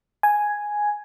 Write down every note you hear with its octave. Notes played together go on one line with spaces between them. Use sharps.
G#5